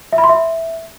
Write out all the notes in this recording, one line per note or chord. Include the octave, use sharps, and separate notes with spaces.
E5
B5
C6
E5